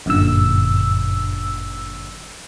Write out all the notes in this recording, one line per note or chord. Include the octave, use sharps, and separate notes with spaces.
G1 F#2 A#2 D3 E6